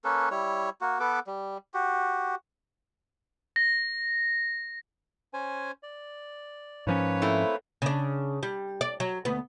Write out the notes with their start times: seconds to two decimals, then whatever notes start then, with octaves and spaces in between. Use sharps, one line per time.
0.04 A#3 C#4 A4 B4
0.31 G3 E4 C#5
0.81 A#3 F#4
1.00 B3 A4 B4 D6
1.27 G3
1.74 F#4 G4
3.56 A#6
5.33 C#4 C5 G#5
5.83 D5
6.87 G#2 F3 A#3 C#4 B4 C#5
7.22 A3 C4 E4
7.82 C#3 D4
8.43 G3
8.81 D5
9.00 F#3
9.25 D2 B3